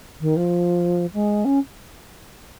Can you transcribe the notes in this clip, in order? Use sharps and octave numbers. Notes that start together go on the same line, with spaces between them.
D#3
F3
G#3
C#4